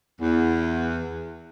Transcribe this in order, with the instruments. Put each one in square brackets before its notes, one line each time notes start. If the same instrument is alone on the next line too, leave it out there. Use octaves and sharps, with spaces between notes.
[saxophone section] E2